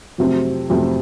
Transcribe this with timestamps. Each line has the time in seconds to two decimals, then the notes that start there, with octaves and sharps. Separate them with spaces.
0.18 F2 C3 F#3 A3 C4
0.70 F2 C3 F#3 A3 C4